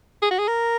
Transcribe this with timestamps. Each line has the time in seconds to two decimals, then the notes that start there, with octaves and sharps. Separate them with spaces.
0.22 G#4
0.31 F#4
0.39 G#4
0.48 A#4